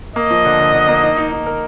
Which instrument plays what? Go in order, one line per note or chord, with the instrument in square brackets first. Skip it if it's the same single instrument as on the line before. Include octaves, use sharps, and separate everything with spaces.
[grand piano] A#3 [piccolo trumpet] D#5
[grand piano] F3
D3
D3
D3
A#3
D#4
D#4
D#4
A#4